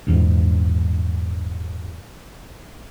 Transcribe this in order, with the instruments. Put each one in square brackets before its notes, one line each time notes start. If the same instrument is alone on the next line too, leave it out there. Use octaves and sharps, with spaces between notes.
[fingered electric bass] A#1 E2 G#2